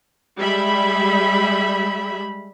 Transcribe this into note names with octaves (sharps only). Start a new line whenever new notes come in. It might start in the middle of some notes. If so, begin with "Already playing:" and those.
G3 G#3 E5 B5